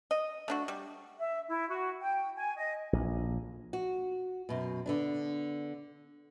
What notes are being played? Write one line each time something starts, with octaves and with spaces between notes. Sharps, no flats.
D#5
A3 D4 F#4
G3
E5
E4
F#4
G5
G#5
D#5
A#1
F#4
F#2 B2
D3 B3 D4